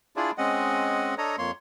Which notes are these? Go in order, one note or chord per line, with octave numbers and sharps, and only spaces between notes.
D4 E4 F4 G#4 D5
G#3 C4 C#4 D#5 F#5
D4 A4 C#5 D#5 A#5
F2 A#3 C#5 C6